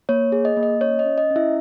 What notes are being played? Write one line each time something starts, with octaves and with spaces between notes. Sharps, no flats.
A#3 C#5
G#4
D#5
A#3
D#5
C#4 C#5
D#5
C#4
D#5
C#4
E4 E5